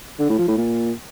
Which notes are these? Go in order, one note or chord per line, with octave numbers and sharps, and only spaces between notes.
D3
A2
F3
A2
A#2